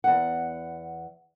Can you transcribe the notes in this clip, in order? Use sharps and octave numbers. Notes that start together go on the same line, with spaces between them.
E2 F#5